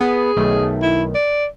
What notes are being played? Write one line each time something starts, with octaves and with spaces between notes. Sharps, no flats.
B3 G#4
B1 D#3 A3
E4
D5